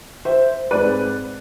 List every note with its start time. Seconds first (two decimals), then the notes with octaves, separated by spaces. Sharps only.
0.25 C5 E5
0.71 G#2 G#3 C4 B4 D5